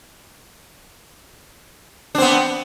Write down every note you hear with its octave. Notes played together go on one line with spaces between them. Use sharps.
B3 C4 D4